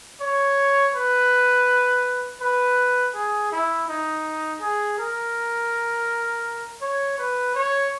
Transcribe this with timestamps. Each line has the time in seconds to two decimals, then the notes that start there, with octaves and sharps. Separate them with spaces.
0.21 C#5
0.94 B4
2.41 B4
3.15 G#4
3.52 E4
3.88 D#4
4.61 G#4
4.98 A#4
6.82 C#5
7.18 B4
7.55 C#5